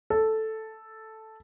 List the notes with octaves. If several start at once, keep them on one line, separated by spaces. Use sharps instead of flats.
A4